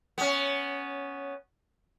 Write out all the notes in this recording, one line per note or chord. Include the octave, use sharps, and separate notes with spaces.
B3 C#4